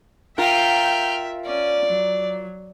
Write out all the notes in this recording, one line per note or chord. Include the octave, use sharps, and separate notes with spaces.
F4 A#4 E5 G5 F6 G6
C#4 D5
F#3